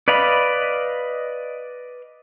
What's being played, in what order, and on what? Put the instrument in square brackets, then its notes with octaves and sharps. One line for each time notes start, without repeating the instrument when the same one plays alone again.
[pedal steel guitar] B4 D5 D#5 F5 B5